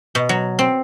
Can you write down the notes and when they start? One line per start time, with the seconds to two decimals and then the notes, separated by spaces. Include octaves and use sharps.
0.15 B2
0.29 F#3
0.59 C4